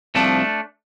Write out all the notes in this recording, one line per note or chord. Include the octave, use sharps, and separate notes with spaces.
C2 C3 F3 A3 D4